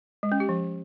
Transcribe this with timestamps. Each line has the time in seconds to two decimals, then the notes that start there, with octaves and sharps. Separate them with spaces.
0.23 G#3
0.32 C#4
0.40 G4
0.49 F3